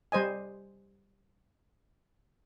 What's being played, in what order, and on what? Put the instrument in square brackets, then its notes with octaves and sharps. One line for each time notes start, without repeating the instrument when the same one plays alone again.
[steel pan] G3 C5 D#5 G#5